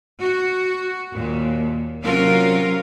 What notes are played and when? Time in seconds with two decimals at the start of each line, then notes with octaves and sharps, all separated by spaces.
0.22 F#4
1.12 D#2 A#2
2.04 C3 F#3 C#4 F4 A#4 F5